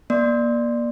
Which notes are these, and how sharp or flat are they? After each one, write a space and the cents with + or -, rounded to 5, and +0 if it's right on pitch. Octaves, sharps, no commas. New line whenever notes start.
A#3 +30 D5 +15 C6 +0